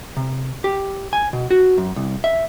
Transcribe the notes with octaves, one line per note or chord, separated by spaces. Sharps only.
C3
G4
G#5
B2
F#4
F#2
C2
E5